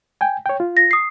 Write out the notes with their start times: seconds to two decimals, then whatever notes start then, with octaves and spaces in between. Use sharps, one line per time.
0.21 G5 G#5
0.46 C#5 G5
0.60 F4
0.77 A#6
0.91 D#6 C7